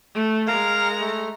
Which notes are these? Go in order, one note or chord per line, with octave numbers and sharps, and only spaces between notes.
A3
G#3 A#4 F5 A#5
A3